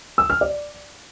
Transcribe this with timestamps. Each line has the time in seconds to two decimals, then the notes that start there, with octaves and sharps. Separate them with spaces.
0.18 E6
0.30 F6
0.41 D5